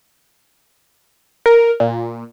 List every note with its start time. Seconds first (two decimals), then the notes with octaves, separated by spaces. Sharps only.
1.46 A#4
1.80 A#2